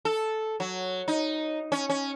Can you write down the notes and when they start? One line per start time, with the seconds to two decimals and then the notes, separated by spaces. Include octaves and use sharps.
0.05 A4
0.60 F#3
1.08 D#4
1.72 C#4
1.89 C#4